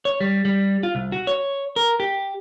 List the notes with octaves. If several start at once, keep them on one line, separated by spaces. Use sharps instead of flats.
C#5
G3
G3
F4
C2
F#4
C#5
A#4
G4